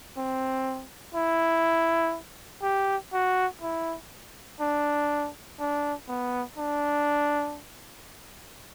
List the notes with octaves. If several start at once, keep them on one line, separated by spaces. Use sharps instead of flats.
C4
E4
G4
F#4
E4
D4
D4
B3
D4